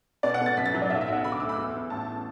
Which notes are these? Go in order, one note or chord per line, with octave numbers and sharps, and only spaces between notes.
B2 D5
F#5
B2
A6
F#2 B6
A6
F#3
D5
B1 E5
E5
B1 F#5
D3 B5
D6
D2 E6
B5
E2
E2
A1 A5